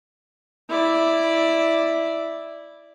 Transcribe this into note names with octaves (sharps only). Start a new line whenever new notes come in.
E4 D5